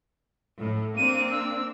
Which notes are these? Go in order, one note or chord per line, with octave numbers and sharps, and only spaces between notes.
A2
A#3 C4 D4 D#7
E6